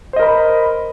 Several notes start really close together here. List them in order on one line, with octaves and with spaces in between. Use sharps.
C5 D#5 A#4 B5